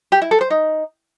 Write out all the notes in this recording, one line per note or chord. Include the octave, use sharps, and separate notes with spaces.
G4
E4
A4
C5
D#4